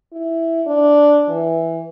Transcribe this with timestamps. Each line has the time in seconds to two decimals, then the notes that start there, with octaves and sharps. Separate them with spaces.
0.12 E4
0.67 D4
1.28 E3